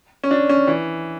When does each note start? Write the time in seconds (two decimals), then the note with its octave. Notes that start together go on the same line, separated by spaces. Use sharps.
0.24 C#4
0.31 D4
0.49 C#4
0.67 E3